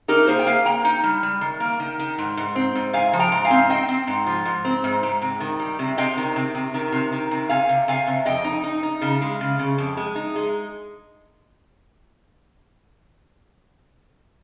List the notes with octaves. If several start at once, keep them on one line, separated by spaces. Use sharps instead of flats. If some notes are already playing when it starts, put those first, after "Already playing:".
D#4 G4 A#4
A#3 G#4 C5
G5
A#3 F5 G#5
A#3 G5 A#5
D#4
G3
G3
D#3
A#3
D#3
D#3
G#2
G#2
C4
G#2
G#2 F5 G#5
F3
G5 A#5
G#2
F5 G#5
C4
C4 D#5 G5
C4
G#2
F3
G#2
C4
G#2
G#2
C3
D#3
G3
C3
C3 D#5 G5
D#3
C3
C3
D#3
C3
D#3
C3
C3 F5 G#5
C3
C3 F5 G#5
C3
F2 D#5 G5
D#4
D#4
D#4
C#3
G#3
C#3
C#3
F2
G#3
D#4
G#3